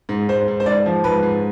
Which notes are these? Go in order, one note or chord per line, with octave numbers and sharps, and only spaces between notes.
G#2
G#2 C5
G#2
C5
G#2 D5
F3
G#2 B4
G#2